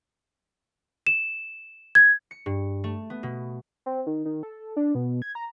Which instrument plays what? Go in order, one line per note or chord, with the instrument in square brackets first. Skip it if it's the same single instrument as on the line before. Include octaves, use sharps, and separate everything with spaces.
[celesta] E7
G#6
[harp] C#7
G2
A3
B3
B2
[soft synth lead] C4
D#3
D#3
A4
D4
B2
G#6
A#5